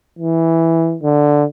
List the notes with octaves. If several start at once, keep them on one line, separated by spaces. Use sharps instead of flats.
E3
D3